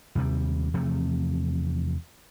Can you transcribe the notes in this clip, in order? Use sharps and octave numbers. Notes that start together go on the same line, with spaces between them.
D#2 C3 G3
E2 C3 F3 A3